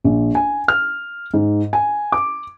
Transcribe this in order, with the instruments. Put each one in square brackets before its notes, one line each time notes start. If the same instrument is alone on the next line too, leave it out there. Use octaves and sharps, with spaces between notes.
[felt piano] A#1
G#5
F6
G#2
G#5
D6